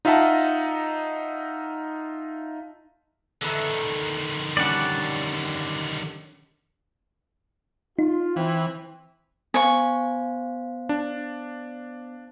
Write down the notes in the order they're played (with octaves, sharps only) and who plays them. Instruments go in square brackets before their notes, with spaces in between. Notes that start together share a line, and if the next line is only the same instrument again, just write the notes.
[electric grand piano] D#4 F4 D#5 E5 F#5 A5
[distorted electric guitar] D3 D#3 [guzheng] A4 B4 E5
[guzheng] G3 C#4 D4 [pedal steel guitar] D5 F#5
[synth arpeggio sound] D#4 [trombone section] F4
[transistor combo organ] E3 [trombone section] C4
[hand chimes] B3 C5 F5 [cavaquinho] G#5 C#6
[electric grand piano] D4